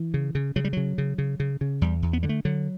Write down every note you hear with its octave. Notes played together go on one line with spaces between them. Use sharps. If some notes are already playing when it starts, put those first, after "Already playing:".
Already playing: E3
C#3
C#3
C#3 F#3
G3
C#3 F#3
C#3
C#3
C#3
C#3
E2 G3
E2
B3
D3 G3
A3
D3 F#3